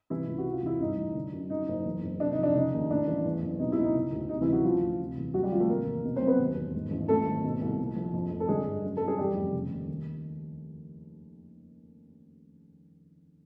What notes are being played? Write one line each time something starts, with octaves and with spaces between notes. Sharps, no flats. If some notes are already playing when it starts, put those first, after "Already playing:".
C3 E3 E4
C#2
F#4
C3
F4
E2 E4
G2 D#4
A1
D3
F#2
F#2 D#4
F#1
E2
F#1
C3 D4
D#4
F2
D4
C#3 D#4
D#2
A2 D4
A1
E2
F#1
B2 D#4
E4
C#2
D#4
C#3
D2
C3 D#4
E3 E4
C#2
F#3 F#4
C#3 F3 F4
D2
C3
E2
F#2 F#3 F#4
G3 G4
G#1 F3 F4
A3 A4
C3 A#3 A#4
E2
B2
C4 C5
B1
B3 B4
D#2
E1
G#2
A1
F#2 A3 A4
G#1
B2
C2
A#2
A#1
F2
F1
A4
D3 G#3 G#4
G2
F#2
G1 A4
G#4
E2 G3 G4
F1
C#3
D#2
D#3